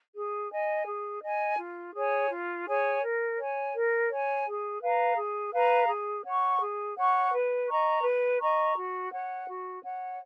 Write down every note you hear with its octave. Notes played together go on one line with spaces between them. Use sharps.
G#4
D#5 G#5
G#4
D#5 G#5
F4
G#4 C#5 G#5
F4
G#4 C#5 G#5
A#4
C#5 G#5
A#4
C#5 G#5
G#4
B4 F5 A#5
G#4
B4 F5 A#5
G#4
C#5 F#5 C#6
G#4
C#5 F#5 C#6
B4
D#5 A#5 C#6
B4
D#5 A#5 C#6
F#4
C#5 F#5
F#4
C#5 F#5